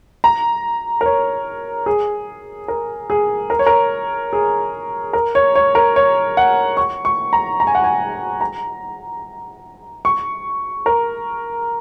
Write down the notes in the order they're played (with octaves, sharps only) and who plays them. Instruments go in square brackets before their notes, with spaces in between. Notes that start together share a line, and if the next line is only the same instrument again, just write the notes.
[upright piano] A#5
A#4
C#5
G#4
A#4
G#4
A#4
C#5
A#4
G#4
A#4
C#5
C#5
A#4
C#5
F#5
C#6
C#6
A#5
A#5
G#5
F#5
G#5
A#5
C#6
A#4